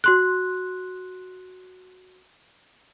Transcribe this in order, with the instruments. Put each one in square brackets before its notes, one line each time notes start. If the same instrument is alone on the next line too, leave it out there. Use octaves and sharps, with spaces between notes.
[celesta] F#4 C6 F#6